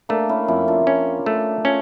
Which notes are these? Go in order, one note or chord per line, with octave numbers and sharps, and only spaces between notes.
A3 A#3 D4
C#4 E4
F2 C#4 E4
D4 F4
C#4
A3
C#4 F4 A4